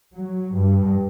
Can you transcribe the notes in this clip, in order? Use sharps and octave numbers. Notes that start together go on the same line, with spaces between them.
F#3
G2